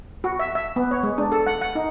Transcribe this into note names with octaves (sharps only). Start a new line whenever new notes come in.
F#4
E5
E5
B3
C#5
G#3
D4
A4
F#5
F#5
D#4